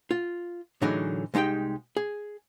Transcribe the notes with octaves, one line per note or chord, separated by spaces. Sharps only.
F4
A2 D3 E3 F#3 D#4 G#4
C2 G#3 D#4 G4 G5
G#4